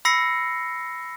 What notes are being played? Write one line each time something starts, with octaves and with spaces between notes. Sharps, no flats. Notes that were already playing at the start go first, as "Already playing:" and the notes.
B5 E6 A#6 C7 C#7